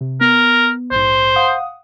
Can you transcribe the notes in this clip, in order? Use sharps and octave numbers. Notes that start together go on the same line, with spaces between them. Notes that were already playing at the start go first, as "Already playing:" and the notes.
C3
B3 A#4
A#1 G#2 C5
F5 F#5 D#6